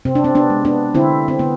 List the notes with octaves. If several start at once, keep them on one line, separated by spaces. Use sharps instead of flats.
C3 C4
D4
C4
B3 D4
G#3
B3 D4
D3 C4 E4
C4
D3 B3